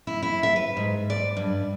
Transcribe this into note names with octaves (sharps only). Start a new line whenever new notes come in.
E4
E4
E5
B4
G#2
D5
G2